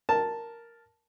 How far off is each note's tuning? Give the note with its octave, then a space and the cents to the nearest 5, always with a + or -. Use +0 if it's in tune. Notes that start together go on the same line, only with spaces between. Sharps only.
A#4 +0 A5 +0